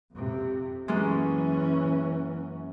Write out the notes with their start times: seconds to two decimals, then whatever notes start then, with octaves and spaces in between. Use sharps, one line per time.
0.13 F2 C3
0.88 F#2 E3 G#3 A#3 C#4